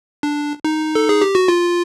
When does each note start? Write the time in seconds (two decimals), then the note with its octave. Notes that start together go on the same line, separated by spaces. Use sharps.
0.23 D4
0.64 D#4
0.95 A4
1.09 G#4
1.22 G4
1.35 F#4
1.48 F4